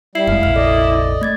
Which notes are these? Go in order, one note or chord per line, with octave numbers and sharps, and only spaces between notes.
G3 E4 C7
F1 G#3 F5 C7
F1 A#1 F6
A4 D5 D#5
A3 G#6 A6